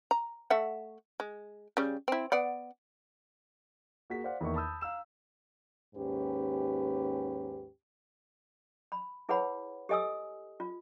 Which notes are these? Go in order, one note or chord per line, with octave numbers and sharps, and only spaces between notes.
A#5
A3 E5 F#5
G#3
C#3 G3
C4 E4
B3 D5 F#5
A#3 F#4 G#4 B6
C5 D5 F5 F#5
E2 D#3 A#3 A#4 E5 C#6
A5 B5 D#6 E6 G6
F5 A#5 E6 E7
D#2 G#2 C#4 G4 B4
B5
E4 G#4 B4 C#5 F#5 B5
G4 A4 D#5 G#5 D#6 E6
F4